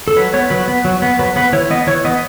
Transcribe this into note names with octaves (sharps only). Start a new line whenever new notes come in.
A4
F#3 B4
B3 C#5
F#3 B4
B3
F#3
B3
F#3 B4
B3 B4
E3 C#5
B3 D#5
E3 C#5
B3 D#5